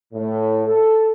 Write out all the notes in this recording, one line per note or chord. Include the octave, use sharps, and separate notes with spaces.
A2
A4